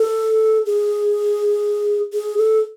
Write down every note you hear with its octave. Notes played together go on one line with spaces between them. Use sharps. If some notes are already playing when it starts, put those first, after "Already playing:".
Already playing: A4
G#4
G#4
A4